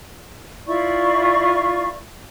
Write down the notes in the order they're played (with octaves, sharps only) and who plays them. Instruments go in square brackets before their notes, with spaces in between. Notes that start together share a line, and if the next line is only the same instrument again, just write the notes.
[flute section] E4 F4 D5 C#6